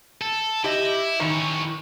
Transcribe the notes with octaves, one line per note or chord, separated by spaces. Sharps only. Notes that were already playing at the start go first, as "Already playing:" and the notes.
A4
E4 G4 D#5
D#3 E3 C#5 A#5